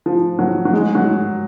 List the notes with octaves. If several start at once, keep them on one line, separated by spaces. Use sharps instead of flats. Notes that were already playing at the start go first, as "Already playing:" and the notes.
F3
F#3
F#3
G#3
F#3